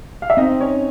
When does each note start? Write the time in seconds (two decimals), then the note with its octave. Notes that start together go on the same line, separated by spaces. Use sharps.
0.22 F5
0.30 E5
0.37 C4 D#4 D#5
0.60 C#4 C#5